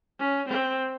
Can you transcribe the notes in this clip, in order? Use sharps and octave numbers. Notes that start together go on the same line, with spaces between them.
C#4
C4